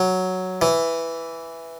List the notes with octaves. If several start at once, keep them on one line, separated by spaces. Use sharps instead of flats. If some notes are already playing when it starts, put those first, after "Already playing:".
Already playing: F#3
E3